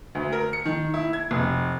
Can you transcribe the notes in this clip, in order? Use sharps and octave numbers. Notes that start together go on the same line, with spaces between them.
D2
A#4
C#7
D#3
E4
G#6
F1